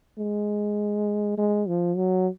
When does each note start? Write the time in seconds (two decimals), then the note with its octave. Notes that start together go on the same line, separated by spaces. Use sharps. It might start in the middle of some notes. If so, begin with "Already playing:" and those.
0.18 G#3
1.38 G#3
1.68 F3
1.97 F#3